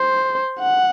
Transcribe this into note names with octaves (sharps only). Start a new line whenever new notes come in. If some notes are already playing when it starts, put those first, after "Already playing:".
Already playing: C5
F#5